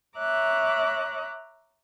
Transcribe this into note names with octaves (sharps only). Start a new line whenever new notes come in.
C#5 E5 A#5 D6 F#6